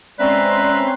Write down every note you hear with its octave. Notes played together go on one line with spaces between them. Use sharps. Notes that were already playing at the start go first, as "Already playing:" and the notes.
G#3 C4 C#4 B4 D5 E5 A#5 C6